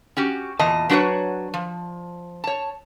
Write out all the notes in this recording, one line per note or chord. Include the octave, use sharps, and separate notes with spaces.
C#4 F#4 G4
E2 A#2 E3 D#5 A5
F#3 D4 F#4 A#4 B4 C#5
F3
C#5 A5